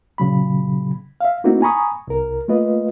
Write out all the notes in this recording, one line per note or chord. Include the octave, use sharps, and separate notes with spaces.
A#2 C#3 F#3 B5
E5 F5
A3 A#3 C4 D#4 E4 F#4
G#5 A#5 B5 C#6 D#6
C2 A#4
A3 A#3 F4 B4 D#5